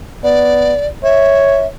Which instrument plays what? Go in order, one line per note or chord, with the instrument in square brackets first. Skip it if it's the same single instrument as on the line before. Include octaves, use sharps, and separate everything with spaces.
[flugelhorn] B3 [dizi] D5
[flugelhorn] C#5 [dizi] E5